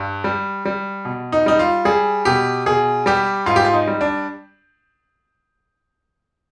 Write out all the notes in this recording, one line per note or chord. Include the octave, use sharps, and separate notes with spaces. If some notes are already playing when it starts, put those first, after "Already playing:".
Already playing: G2
G3
G3
B2
D#4
G3 D#4
F4
G3 G#4
B2 G4
B2 G#4
G3 G4
G#2 F4
G4
F4
D#4
G3
D4